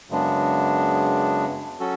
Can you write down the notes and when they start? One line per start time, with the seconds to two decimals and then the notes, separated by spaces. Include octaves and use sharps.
0.09 F#2 C#3 G#3 B3 D4
1.80 F#3 C#4 F#4 A4